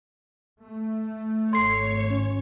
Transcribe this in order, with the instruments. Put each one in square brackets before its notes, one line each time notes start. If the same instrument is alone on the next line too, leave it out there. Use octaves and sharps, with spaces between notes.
[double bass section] A3
[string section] G#1 C#5 [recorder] A4 [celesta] C6 C7
[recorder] C#4